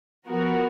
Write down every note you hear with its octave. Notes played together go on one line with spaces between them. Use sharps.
F3 B3 F#4 A#4